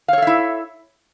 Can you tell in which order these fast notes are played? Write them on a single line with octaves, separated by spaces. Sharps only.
F5 C#5 A4 E5 E4